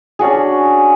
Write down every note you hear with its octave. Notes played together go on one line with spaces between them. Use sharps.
C#4 D4 F#4 G#4